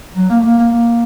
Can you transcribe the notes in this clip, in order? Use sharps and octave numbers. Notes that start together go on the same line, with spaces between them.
F#3
A#3
A3
A#3
A#3
A#3